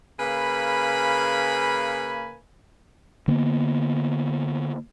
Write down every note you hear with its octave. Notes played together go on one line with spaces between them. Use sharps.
C#3 A#3 B4 G#5 B5
D3 A#3 B3